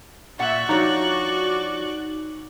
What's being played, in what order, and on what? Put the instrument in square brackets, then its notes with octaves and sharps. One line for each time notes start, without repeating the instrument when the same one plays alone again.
[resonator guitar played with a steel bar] A#2 D5 F#5 [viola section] E5 [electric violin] C#6 F#6
[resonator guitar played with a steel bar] F3 D4 C#5 [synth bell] D#4 [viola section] F#4 D5